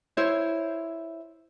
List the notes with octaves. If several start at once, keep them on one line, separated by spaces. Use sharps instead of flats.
E4 C5 C#5